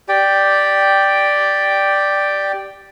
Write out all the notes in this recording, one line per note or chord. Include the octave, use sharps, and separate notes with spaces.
G4 D5 G5